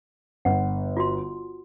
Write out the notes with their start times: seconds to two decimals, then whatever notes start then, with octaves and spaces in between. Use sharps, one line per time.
0.45 G1 F#5
0.97 F4 F#4 C6